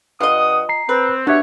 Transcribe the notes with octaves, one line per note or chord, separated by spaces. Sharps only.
G2 F4 D#5 F#5 D#6
A#5 C7
C4 B4
B3 D4 F#4 G4 C#5 E5